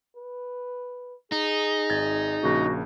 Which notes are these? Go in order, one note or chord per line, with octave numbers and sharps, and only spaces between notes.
B4
D#4 G#4
G#1 G#6 A6
A#1 C#3 A#3 F#4